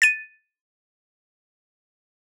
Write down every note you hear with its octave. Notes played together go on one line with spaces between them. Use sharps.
A6 D#7